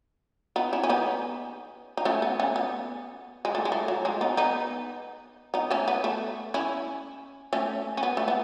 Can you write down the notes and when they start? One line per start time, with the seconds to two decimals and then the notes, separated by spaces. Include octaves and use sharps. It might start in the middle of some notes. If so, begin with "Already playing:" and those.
0.56 B3 D#4
0.73 C#4 E4
0.83 C#4
0.89 B3 D#4
1.97 D#4
2.05 A3 C#4
2.22 B3
2.40 A3 C#4
2.56 B3
3.45 G#3
3.55 A3
3.65 G#3
3.72 A3
3.88 F#3
4.05 G#3
4.21 B3 D#4
4.37 B3 D#4
5.54 B3 D#4
5.71 A3 C#4
5.88 B3
6.04 A3
6.54 C#4 E4
7.53 A3 C#4
7.97 C#4
8.03 B3
8.17 A3
8.28 B3